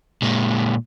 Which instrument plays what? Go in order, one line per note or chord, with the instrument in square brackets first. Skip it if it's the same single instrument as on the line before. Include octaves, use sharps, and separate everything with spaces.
[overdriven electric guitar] A#2 G#3